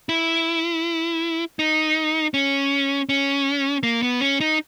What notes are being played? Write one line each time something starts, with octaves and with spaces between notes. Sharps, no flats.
E4
D#4
C#4
C#4
A#3
B3
C#4
D#4